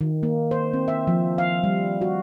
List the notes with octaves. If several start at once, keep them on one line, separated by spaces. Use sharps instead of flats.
D#3
A#3
C5
C4
E5
F3
F5
G3
F#4